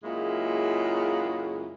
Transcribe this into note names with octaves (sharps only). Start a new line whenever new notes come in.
F#2 A#2 C#3 G#3 E4